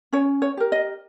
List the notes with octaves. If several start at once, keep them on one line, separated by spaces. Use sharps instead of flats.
C#4 C#5
C#5
G4 A#4
D#5